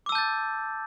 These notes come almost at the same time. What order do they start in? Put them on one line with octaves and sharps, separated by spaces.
D6 E6 A5 G6 A6